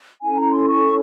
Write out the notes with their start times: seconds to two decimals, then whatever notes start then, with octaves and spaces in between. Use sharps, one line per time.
0.21 C#4 E4 A4 G#5
0.37 A#5
0.53 C6
0.68 C#6